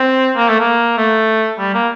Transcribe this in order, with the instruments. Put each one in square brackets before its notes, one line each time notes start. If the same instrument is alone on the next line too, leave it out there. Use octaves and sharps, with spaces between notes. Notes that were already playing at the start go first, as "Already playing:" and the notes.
Already playing: [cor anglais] C4
A#3
A3
A#3
A3
G3
A#3